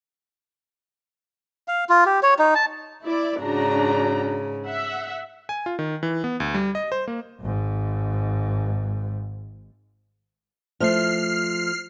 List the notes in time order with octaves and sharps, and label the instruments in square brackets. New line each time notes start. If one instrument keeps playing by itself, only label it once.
[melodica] F5
F4
G4
C#5
D#4
A5
[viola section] E4 D5
[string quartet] G#2 C#3 [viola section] D4 F#4 A#5
[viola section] E5 F#5
[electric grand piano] G#5
F4
D#3
E3
B3
D2
G3
D#5
C5
A#3
[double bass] G#1 G#2
[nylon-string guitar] F3 A3 [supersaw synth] F6 C7